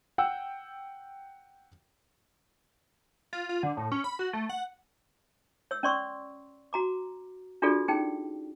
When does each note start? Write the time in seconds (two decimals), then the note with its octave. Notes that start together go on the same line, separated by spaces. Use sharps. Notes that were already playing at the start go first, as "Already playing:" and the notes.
0.18 F#5 G5 E6
3.33 F4
3.49 F4
3.63 D3
3.77 A2
3.92 C#4
4.04 B5
4.19 F#4
4.33 A3
4.49 F#5
5.71 C#5 E6
5.83 C#4 C#5 D5 C6 C#6 E6
6.73 F#4 A#5 D6
7.62 D4 F4 F#4 G#4 A4 D5
7.88 C#4 D#4 G#4 G5